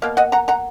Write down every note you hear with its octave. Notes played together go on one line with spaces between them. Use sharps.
B2 A#3 F5
D#5 F#5
F#5 A#5
F#5 A#5